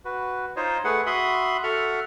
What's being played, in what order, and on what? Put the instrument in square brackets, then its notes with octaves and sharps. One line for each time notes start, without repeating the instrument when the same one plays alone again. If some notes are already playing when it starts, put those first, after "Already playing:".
[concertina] F#4 B4
D#4 F4 C5 C#5 D#5
A3 G#4 B4 F#5
F#4 E5 B5 C6 D#6
F#4 A4 E5 F#5 F6